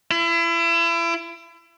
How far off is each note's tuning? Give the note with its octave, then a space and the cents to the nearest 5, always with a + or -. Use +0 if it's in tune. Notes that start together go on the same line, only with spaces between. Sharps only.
E4 +35